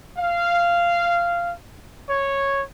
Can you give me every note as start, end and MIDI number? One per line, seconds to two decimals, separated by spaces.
0.18 1.52 77
2.09 2.62 73